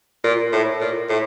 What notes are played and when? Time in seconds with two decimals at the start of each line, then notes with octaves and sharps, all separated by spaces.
0.24 A#2
0.53 A2
0.81 A#2
1.09 A2